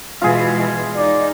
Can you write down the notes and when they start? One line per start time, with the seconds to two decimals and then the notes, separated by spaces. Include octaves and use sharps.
0.21 B2 E3 G#3 F4 G#4
0.96 D#4 D5